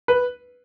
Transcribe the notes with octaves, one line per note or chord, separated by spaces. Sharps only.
B4